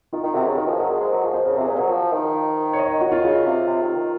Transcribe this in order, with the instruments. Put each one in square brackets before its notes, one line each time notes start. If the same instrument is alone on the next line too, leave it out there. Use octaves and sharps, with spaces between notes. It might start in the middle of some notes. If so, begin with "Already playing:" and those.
[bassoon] D#3 [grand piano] F4
[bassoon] D#3
[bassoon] C3 [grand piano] F#4
[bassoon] C#3
[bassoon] D#3 [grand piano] A#4
[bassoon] F3 [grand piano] G#4
[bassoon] F#3 [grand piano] A#4
[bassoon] G#3
[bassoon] G#3 [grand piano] C5
[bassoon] F#3 [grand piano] A#4
[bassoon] F3 [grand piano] G#4
[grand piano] C5
[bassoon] C#3 [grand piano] A#4
[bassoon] C3 [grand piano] G#4
[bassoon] A#2
[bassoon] F#3 [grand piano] C5
[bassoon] F3
D#3
[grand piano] C#5
D#5
C#5
F#4
F4
[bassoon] C#3
C3
C3
D#3
D#3